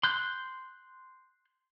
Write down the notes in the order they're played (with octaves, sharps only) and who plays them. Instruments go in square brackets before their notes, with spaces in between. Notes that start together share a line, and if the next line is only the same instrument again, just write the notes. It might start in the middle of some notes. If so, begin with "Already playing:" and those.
[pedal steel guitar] C6 F#6 G6